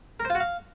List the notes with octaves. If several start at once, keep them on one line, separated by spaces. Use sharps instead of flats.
A#4
C5
F4
F#4
F5